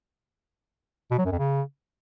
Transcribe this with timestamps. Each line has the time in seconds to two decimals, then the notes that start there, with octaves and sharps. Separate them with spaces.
1.11 B2
1.18 F#3
1.25 F#2
1.32 F2
1.39 C#3